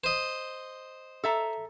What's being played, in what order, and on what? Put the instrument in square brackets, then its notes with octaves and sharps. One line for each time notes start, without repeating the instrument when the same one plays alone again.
[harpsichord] C5 D#5
[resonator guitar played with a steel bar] A4 E5 A#5